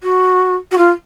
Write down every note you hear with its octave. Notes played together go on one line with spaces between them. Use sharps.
F#4
F#4
F4